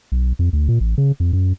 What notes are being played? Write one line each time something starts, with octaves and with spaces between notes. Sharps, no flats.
B1
F2
D2
A#2
A1
C#3
F2
F#2